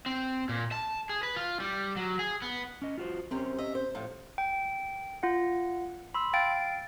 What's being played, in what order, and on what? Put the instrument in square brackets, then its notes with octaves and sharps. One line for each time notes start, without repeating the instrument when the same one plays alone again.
[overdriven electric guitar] C4
A#2
A5
G#4
B4
F4
G3
F#3
G#4
B3
[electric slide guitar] C#4 D#5
F4 F#4 C5
[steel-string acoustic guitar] F#2 C3 C5 [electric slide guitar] C4 C#4
[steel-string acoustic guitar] D#5 E5
C5
A2 F3
[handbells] G5
F4 F#5
B5 C6 E6
F5 G5 A6 D7